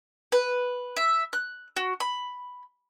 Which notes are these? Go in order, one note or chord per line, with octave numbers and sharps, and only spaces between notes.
B4
E5
F#6
F#4
B5